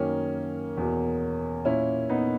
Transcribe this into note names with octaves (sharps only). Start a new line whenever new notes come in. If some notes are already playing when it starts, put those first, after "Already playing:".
Already playing: F#2 D#3 A#3 C#4
E2 B2
A#2 C#4 E4
B3 D#4